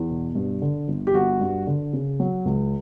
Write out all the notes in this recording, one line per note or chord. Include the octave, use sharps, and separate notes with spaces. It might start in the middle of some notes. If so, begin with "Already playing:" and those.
Already playing: E2
B2
G2
D3
G1
G4
G1 F#4
G2
D3
C#3
F#3
C#2